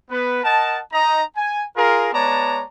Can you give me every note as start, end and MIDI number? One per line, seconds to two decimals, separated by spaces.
0.10 0.40 59
0.10 0.40 71
0.43 0.80 70
0.43 0.80 75
0.43 0.80 78
0.43 0.80 81
0.93 1.22 63
0.93 1.22 75
0.93 1.22 82
1.36 1.63 80
1.76 2.11 65
1.76 2.11 68
1.76 2.11 70
2.13 2.63 56
2.13 2.63 59
2.13 2.63 73
2.13 2.63 74
2.13 2.63 81
2.13 2.63 82